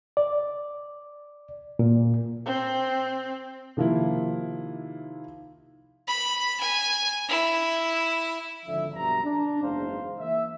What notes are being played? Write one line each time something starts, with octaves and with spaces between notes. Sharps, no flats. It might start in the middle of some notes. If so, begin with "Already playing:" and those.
D5
A#2
C4
C3 D#3 F3 A#3 E4
B5
G#5
E4
G#1 D3 F3 E5
B1 G2 A#5
D4
F#1 E2 G#2 C5 F5
E3 A#3 E5